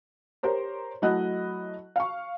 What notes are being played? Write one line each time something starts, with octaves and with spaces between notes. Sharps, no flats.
G4 A#4 C5 C#5
F#3 A3 E4 D#5 F#5 F#6
F5 C#6